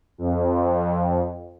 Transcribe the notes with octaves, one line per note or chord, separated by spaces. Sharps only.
F2